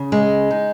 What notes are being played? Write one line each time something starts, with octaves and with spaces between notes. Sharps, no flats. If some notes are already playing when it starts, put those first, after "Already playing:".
Already playing: C#3
G#3
D#4